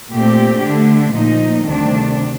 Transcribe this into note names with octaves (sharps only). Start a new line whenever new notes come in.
A#2 A3 C4 G4
D3 A3 D4
A#2 F3 A#3 D#4
D2 C3 D#3 G3 D4